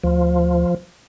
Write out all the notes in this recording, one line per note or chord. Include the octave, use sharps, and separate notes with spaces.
D2 F3